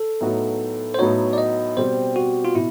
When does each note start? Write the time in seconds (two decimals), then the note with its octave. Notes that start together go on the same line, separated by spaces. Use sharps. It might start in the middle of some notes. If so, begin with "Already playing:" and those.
Already playing: A4
0.20 A2 F#3 B3 D#4 F#4
0.94 C5
0.98 A2 F#3 B3 D#4 F#4 C#5
1.33 D5
1.38 D#5
1.77 B2 G3 C4 C5
2.16 F#4
2.45 F4
2.55 B2 E4